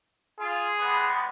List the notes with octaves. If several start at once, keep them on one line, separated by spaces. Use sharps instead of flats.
F4 G#4
G3 G#3 B3